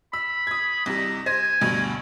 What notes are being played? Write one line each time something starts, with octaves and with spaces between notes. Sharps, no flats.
B5 E6
D#6 G#6
C2 C3 G3 D#5
C5 G#5 A#6
D2 G2 B2